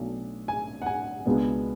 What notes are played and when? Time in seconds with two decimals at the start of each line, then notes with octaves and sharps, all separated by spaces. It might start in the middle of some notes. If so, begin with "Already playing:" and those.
Already playing: B1 B2 A3 D4
0.48 G#5
0.82 F#5
0.86 G#5
1.25 C#2 B2 G#3 B3 D4